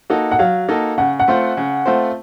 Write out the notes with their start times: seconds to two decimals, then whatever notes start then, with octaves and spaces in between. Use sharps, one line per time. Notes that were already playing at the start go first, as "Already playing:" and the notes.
0.10 A#3 D#4 F#4 A4
0.32 F#5
0.39 F#3 F5
0.69 A#3 D#4 F#4 A4
0.98 C#3 F#5
1.20 F#5
1.28 A3 C4 F4 C5
1.57 C#3
1.86 A3 C4 F4 C5